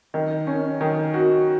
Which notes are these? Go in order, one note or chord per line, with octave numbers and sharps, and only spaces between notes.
D#3
C#4
D#3
F#4